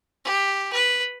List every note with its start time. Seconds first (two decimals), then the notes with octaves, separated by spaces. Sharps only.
0.25 G4
0.72 B4